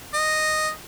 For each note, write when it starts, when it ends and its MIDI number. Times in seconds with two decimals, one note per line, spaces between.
0.14 0.70 75